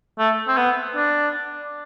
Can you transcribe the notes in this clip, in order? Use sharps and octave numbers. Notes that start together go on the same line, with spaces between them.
A3
C4
B3
D4